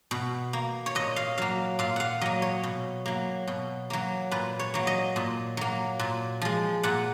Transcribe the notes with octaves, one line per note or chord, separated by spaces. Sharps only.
B2
A#3
C#5
A#2 D#5
F5
F#3 A#3 F5
A#2 F5
F5 F#5
F#3 A#3 D#5
C#5
B2
F#3 A#3
B2
F#3 A#3
A#2 B4
C#5
F#3 A#3
D#5
A#2
F#3 A#3
A#2
F3 G#3
A#2 F#5